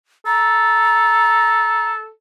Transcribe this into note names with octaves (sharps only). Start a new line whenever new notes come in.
A4 A#5